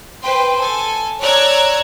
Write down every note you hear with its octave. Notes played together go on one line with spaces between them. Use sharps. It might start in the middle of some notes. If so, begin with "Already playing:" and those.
B4 C5 G5 C6
A4 G#5
C#5 D5 A#5 E6 F#6 G#6